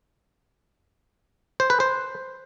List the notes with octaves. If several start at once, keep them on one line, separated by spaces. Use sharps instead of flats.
C5
B4
C5